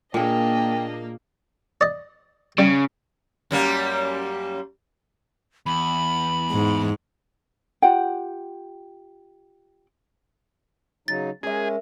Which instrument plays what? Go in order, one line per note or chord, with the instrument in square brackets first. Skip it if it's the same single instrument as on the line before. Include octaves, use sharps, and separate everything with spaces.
[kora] A#2 G#4 [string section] A#3 [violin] D4 D#5 [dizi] G5
[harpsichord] D5 D#5
[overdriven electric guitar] C#3 [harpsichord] G3
[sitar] F#2 G3 A#3
[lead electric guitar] E2 [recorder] B5
[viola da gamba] G#2
[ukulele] F4 G4 F#5 G5
[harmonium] C#3 F#3 D#4 [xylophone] A6
[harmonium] G#3 C#4 [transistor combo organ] G#4 [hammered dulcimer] A#4 E5